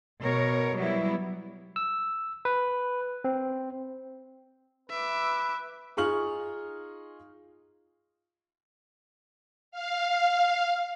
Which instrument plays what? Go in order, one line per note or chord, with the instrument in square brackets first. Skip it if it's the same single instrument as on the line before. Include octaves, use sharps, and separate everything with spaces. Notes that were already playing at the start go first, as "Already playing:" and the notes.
[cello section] B2 A#4 C#5
F#3 G3 B3 E4
[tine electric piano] E6
B4
C4
[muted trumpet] B4 [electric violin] E5 D6
[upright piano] D#4 F4 G#4 C#6 F6 F#7
[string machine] F5